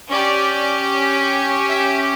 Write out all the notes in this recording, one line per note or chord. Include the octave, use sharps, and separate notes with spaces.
C#4 G4 D5
E5